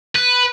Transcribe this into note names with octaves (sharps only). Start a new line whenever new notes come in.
B4